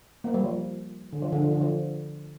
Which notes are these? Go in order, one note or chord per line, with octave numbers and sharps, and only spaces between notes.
A#3
G3
F3
D3
F3
D3
F3
D3
F3